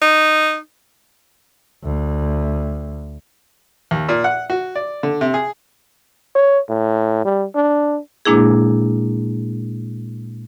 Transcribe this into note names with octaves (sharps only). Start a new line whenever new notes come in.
D#4
D2
D#2
A#2
F#5
F#4
D5
D3
C3
G#4
C#5
A2
G3
D4
A#2 G#3 A#3 D4 E4 G#4